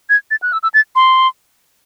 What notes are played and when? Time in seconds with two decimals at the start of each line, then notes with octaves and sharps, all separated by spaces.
0.10 G#6
0.31 A6
0.42 F#6
0.53 E6
0.63 E6
0.74 A6
0.96 C6